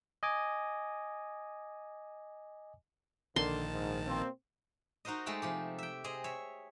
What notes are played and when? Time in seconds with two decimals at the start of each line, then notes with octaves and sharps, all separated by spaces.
0.23 D#5 G#5 D6
3.36 A#1 D3 D#3 A#3 A5 C6
3.74 G#2
4.07 B2 A#3 C4
5.05 D#4 F#4 A#4 C5 D#5
5.26 G#3 A3 A4 G5 B5
5.42 C3 F3 G4
5.78 E5 G5
6.04 C4 G#4 D#5
6.24 C#5 E5